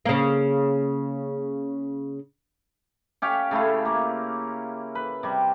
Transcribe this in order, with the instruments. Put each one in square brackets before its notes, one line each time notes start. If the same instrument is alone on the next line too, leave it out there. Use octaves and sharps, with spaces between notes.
[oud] C#3 A#3
[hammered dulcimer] C#4 G4 F5
C#3 A3 E4 F4
A#3
B4
C3 G3